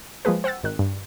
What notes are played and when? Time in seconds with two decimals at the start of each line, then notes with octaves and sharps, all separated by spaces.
0.25 F3 G#3 A#3 G#4 B4
0.44 C5 F#5 G5 E6 A6
0.64 G#1 D#3 F#6
0.79 G2